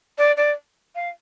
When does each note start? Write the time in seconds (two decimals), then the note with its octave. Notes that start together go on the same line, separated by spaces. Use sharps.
0.18 D5
0.37 D5
0.95 F5